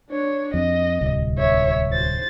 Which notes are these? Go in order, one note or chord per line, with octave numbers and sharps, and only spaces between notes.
D4 C#5
F2 D#5
D1 C2
C#5 E5
C5 A6